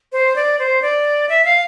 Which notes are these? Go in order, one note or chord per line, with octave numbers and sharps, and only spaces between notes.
C5
D5
C5
D5
E5
F5